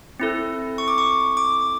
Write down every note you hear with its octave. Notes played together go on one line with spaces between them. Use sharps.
C4 E4 A4
C#6
D6
C#6
D6